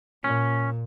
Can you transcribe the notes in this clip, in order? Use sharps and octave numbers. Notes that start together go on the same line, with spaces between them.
A#2 C#4